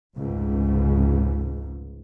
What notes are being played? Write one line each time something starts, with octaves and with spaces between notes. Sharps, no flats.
F1 C#2 G#2